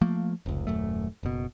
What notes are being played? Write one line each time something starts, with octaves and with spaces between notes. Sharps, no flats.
F3 A3 A#3
F1 C#2
D#1 F#2 A3
F#1 B2